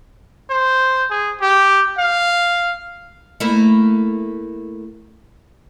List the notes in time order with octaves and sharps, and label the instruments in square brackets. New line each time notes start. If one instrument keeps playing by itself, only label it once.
[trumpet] C5
G#4
G4
F5
[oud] A3 A#3 E4